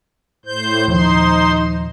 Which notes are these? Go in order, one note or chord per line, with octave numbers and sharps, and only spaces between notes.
A2 C5 G6
D#2 A#2 F3 D#4 C5 C6